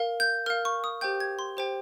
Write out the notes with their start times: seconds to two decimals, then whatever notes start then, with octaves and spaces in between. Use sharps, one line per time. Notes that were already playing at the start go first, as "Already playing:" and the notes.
Already playing: A#4 F5
0.20 G6
0.46 A#4 F5 F6
0.65 C#6
0.84 D#6
1.01 G4 C5 G5 G6
1.20 G#6
1.39 C6
1.57 G4 C5 G5